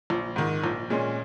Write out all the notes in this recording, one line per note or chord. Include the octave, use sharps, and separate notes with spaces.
A#1
G#2 D#3
A#1
A#2 G#3 C#4